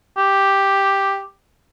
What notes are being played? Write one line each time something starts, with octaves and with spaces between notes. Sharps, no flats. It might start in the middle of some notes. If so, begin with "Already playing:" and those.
G4